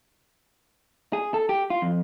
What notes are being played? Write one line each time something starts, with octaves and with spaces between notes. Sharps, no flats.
G#4
A4
G4
F4
F2